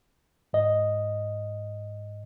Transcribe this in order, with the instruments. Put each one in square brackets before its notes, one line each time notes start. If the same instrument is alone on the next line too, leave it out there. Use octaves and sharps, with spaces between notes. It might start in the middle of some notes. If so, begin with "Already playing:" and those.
[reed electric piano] G#2 D#5